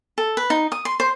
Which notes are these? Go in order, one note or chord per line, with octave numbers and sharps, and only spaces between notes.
A4
B4
D#4
D#6
C6
C5